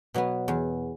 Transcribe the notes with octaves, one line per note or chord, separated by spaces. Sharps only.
B2 F#3 B3
E2